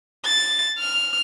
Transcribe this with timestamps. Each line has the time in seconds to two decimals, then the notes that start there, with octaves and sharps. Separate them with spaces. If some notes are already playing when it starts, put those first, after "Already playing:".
0.25 A6
0.79 F6